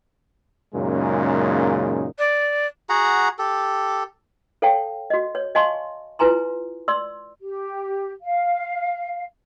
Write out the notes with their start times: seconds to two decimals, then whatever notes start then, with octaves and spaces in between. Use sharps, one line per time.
0.74 F#2 A#2 C#3 G#3 A#3 D#4
2.19 D5
2.89 F#4 G#4 F#5 A#5
3.39 G4 A4
4.62 A4 C#5 F5 G5 A5
5.10 F#4 D#5
5.35 C#5
5.55 D#5 F5 G#5 A5 C6 C#6
6.19 E4 F4 B4 G#5 A#5 C6
6.88 D5 C6 E6
7.40 G4
8.22 F5